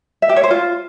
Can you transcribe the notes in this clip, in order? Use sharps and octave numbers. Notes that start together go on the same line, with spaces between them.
E5
G4
C#5
C5
F4